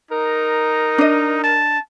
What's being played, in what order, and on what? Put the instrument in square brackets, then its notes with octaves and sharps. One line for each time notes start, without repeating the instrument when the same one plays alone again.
[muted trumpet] D#4 [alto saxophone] A#4
[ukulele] D4 D#5
[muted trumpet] A5